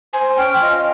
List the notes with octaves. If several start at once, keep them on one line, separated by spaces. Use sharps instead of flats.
C5 G#5
C#4 G5
F4 D#5